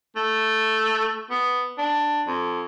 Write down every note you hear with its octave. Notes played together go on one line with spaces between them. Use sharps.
A3
B3
D4
F2